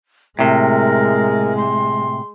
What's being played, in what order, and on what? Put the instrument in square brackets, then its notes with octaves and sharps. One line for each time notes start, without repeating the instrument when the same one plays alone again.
[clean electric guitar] A2 C3 [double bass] G#3 [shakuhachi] A#4
[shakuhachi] C6